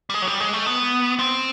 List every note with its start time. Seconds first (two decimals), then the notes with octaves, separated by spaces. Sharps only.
0.10 G3
0.14 G#3
0.22 F#3
0.27 G3
0.40 G#3
0.53 A3
0.67 B3
1.19 C4